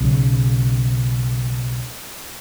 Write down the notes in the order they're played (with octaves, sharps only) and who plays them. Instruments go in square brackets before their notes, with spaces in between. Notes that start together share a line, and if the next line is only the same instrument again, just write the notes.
[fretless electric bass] B1 C#3